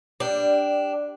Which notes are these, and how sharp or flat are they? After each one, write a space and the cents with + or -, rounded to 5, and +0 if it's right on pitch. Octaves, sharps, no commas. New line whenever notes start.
G3 +10 D4 +0 G5 -20